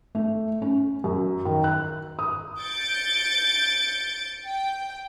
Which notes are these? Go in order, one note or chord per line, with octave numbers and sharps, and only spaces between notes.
A3
C#4
F#2
D#3
F#6
D#6
G6 A6 C#7 D7
G5